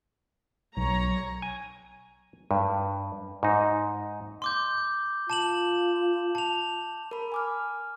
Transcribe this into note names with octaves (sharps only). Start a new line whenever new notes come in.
B1 C#5 A#5
G#5
G2
G#2 D#4
C6 D6 G6
F4 A5 E7 F#7
A5 F7
A#4 B5
G#5 D6 F6